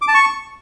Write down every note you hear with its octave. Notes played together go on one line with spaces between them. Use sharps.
D6
A5
C#6